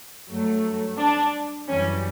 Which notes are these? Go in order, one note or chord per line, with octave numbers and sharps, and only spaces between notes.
G2 F#3 A3
D4
F#2 E3 G3 C#4